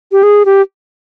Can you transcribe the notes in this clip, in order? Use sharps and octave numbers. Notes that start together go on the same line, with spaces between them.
G4
G#4
G4